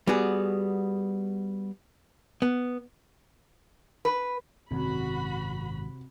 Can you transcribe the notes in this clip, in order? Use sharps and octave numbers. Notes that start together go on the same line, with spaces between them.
G3 B3 F#4 G#4
B3
B4
G#1 F#2 C3 F#4 B5